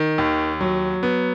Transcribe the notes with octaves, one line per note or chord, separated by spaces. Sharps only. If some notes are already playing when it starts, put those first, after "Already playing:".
Already playing: D#3
D#2
F#3
B3